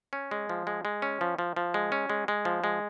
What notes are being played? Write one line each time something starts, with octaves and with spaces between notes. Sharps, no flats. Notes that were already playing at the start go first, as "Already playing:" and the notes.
C#4
G#3
F3
G#3
G#3
C#4
F3
F3
F3
G#3
C#4
G#3
G#3
F3
G#3